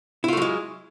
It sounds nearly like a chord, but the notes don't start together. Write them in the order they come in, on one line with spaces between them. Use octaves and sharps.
E4 F4 A3 F#3 G#3